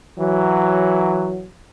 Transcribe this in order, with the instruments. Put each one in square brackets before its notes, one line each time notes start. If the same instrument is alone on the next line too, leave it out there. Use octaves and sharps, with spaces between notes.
[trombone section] E3 F#3